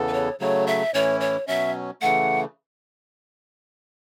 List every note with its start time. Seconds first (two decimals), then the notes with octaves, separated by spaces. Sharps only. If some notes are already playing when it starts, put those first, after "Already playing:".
Already playing: E2 C#3 E3 B3 A4
0.08 B4
0.13 C#5
0.40 C#3 F#3 A3 C#5
0.67 E5
0.94 A2 E3 C#4 E4 C#5
1.20 C#5
1.47 B2 F#3 C#4 E5
2.01 C#3 E3 A3 F#5